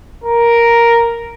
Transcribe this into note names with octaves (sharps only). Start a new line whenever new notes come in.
A#4